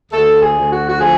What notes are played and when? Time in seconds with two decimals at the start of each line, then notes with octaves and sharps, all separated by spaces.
0.12 D2 A4
0.41 G#4
0.56 D2
0.71 F#4
0.89 F#4
1.00 F3 G#4